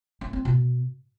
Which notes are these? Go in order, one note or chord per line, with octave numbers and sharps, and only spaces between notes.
C#4
C4
B2